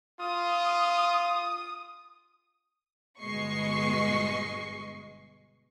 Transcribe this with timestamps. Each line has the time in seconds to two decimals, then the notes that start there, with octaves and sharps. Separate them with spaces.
0.20 F4 D#6
3.21 G1 B2 G#3 D#5 C#6 C7